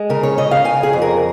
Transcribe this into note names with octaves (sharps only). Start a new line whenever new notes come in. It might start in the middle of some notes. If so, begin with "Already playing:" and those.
Already playing: G#3
C#3 A#4
C#5
C#3 D#5
F5
C#3 G#5
G#4
F2
A#4